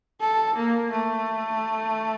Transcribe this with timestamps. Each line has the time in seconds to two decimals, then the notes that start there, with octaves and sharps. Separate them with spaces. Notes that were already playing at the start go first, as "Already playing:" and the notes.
0.21 A4
0.56 A#3
0.92 A3